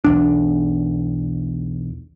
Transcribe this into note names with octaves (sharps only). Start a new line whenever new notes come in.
B1 E2 D4